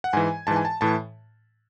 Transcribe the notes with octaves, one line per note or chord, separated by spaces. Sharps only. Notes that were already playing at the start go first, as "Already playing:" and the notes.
F#5
G#2 E3 G#5
G#2 E3 A5
G#5
A5
A2 E3 A5